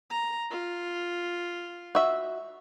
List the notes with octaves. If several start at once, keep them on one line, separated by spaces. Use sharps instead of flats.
A#5
F4
F#4 E5